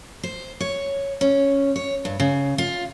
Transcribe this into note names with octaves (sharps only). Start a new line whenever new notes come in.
C5
C#5
C#4
C#5
G2
C#3
F4